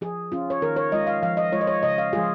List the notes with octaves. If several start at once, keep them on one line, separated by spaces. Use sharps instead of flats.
F3 G#4
C#4 F4
C#5
D#3 A#4
C#5
G#3 F4 D#5
F5
F3 F5
D#5
G#3 F4 C#5
D#5
C#5
C#3 D#5
F5
F3 G#3 F4 G#4